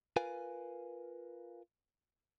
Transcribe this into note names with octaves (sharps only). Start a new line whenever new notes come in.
F4 A#4 B4 F5 G#5